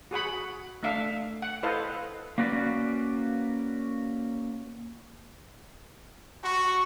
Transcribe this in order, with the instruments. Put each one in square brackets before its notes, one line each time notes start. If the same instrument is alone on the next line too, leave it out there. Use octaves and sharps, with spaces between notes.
[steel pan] F#4 G#4 F#5 B5
A3 D4 E5 F5
F#5
E4 A4 B4 C5 D#5 F5
[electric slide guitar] A#3 C#4 F#4 B4 D5
[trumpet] F#4 [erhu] C#6